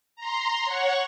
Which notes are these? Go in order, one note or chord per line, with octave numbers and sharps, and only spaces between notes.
A#5 C6
C#5 F#5 C#6